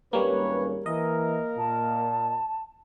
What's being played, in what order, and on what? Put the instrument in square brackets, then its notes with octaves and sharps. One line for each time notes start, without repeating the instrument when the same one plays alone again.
[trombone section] G#1 C#4 [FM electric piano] G3 A#3 [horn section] B4 C#5
[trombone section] E3 [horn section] A#3 A#4 [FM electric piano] D#5
[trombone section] A#2 [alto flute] A5